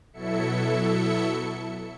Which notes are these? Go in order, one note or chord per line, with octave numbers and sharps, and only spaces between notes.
B2 F#3 E4 A4 E5 C#7